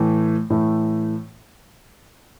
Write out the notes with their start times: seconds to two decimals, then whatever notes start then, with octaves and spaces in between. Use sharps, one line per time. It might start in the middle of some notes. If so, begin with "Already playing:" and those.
Already playing: A2 E3 A3
0.50 A2 E3 A3